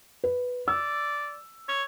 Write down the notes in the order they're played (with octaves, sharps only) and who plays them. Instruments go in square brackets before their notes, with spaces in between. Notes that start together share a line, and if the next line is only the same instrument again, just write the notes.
[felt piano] B4
[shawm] D5 [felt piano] E6
[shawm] C#5